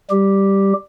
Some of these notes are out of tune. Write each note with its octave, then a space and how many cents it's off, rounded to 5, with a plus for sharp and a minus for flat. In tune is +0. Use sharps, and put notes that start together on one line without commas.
G3 +0 G4 +0